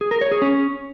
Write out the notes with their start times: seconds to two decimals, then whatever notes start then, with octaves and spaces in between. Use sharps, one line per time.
0.01 G#4
0.11 A#4
0.21 C#5
0.32 G#4
0.42 C#4